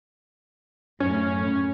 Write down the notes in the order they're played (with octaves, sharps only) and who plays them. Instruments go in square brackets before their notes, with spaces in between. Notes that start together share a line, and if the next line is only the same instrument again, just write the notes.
[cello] F#2 A2 [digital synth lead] C#4